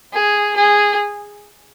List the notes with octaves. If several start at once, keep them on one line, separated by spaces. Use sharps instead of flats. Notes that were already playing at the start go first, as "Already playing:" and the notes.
G#4
G#4